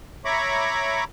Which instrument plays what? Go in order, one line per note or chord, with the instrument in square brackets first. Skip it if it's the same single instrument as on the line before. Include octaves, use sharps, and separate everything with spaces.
[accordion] C#5 E5 A#5 B5 C#6 D6